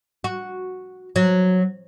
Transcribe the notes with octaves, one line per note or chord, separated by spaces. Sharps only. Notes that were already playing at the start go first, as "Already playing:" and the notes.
F#4
F#3